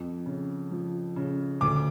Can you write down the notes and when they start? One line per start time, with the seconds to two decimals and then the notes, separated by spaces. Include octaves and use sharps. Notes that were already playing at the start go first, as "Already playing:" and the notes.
Already playing: F2
0.26 C#3
0.71 F3
1.16 C#3
1.61 D2 D6